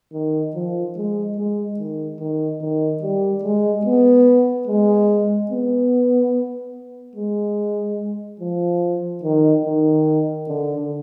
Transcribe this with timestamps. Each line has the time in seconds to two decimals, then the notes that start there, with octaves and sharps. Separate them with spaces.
0.13 D#3
0.55 F3
0.96 G#3
1.36 G#3
1.78 D#3
2.20 D#3
2.61 D#3
3.02 G3
3.43 G#3
3.85 B3
4.67 G#3
5.51 B3
7.15 G#3
8.40 F3
9.23 D#3
9.64 D#3
10.48 D3